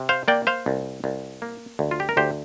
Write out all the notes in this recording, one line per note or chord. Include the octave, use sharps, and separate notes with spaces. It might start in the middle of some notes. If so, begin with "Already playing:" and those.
Already playing: C3
C5 F5
A#3 D5 G5
C5 F5
C2
C2
A#3
D2
F4
G4
A#4
D2 G4 C5